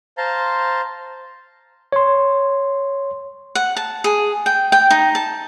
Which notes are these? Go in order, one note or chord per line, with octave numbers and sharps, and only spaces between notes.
C5 F5 A5 A#5 C6
C#5 C6
F#5
A5
G#4
G5
G5
D#4
A5